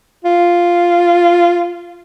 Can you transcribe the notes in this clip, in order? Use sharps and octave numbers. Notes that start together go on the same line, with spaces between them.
F4